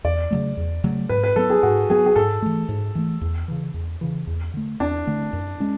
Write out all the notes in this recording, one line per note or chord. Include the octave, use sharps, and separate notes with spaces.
E2 D5
C#3 F#3 A3
E2
C#3 F#3 A3
G#2 B4
B4
F#3 B3 A4
G#4
G#2 F#4
F#3 B3 G#4
G#4
G#2 A4
E3 A3
G#2
E3 A3
E2
C#3 E3
E2
C#3 E3
E2
D3 A3
E2 D4
D3 A3
F#2
G#3 C#4